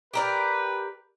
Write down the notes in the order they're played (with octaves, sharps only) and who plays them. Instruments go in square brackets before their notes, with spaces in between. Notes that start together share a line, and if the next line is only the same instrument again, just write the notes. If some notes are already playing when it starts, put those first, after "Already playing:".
[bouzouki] G4 A#4 D5 [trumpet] B4